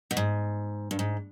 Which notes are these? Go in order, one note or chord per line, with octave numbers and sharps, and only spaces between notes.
B2
G#2
G2
G#2